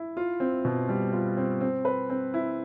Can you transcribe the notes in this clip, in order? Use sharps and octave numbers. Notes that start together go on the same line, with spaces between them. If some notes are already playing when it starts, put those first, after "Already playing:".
Already playing: E4
F4
C4
B2
G3
F4
C4
C4
B4
C4
E4